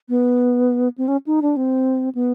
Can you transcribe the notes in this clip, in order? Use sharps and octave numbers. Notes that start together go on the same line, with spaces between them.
B3
C4
C#4
D#4
D4
C4
B3